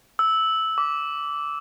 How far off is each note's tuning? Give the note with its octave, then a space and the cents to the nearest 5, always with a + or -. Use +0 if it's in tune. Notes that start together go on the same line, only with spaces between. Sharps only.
E6 -10
D6 -20